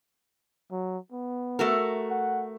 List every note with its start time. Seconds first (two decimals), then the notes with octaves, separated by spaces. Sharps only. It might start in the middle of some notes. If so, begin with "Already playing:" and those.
0.71 F#3
1.12 B3
1.59 A3 F#4 A#4
2.10 F#5